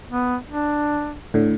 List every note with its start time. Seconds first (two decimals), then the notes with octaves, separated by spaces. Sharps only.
0.10 B3
0.50 D4
1.34 A2 D3